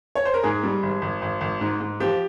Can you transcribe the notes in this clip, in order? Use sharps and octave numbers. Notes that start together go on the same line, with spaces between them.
C#5
C5
A#4
G#2 G#4
G3
G#1
G#1
G#1
G#1
G#2
G#2
F3 G4